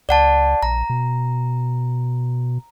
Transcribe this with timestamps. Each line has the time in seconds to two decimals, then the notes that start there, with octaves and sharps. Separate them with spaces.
0.09 C#2 D5 F#5 A5
0.63 A#1 A#5
0.90 B2